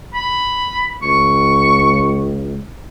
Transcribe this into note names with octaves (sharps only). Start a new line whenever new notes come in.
B5
C#2 C#6